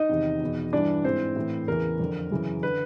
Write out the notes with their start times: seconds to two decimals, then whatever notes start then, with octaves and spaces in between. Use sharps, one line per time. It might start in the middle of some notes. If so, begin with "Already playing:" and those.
Already playing: D#4 D#5
0.09 E2 C3 D#3
0.41 E2 B2
0.73 G2 E3 D4 D5
1.04 G#2 E3 C4 C5
1.36 A2 E3
1.68 E2 C#3 E3 A#4
2.00 F2 D3
2.31 F#2 C#3 E3
2.63 D3 B4